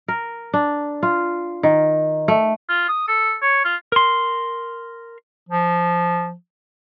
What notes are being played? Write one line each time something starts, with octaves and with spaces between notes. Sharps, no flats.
A#4
D4
F4
D#3
A3
F4
D#6
A4
C#5
F4
A#4 C6
F3